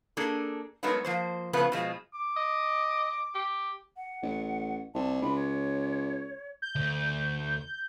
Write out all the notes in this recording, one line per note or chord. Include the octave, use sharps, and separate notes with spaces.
A#3 D4 G#4 A4
F#3 G#3 A3 B3 D#4 A#4
F3 A#3 C5
A2 C#3 F3 A3 B3 B4
B2 F3 G#3
D6
D#5
G4
F#5
A1
C2 A5
C#2 B5
C#5
G6
D2